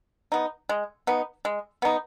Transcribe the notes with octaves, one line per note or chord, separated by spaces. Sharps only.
B3 D#4
G#3
B3 D#4
G#3
B3 D#4